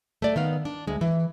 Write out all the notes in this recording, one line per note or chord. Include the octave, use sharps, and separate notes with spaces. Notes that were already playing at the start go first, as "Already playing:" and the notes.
A3 D5
D#3 B3 F5
D4
D2 G#3
E3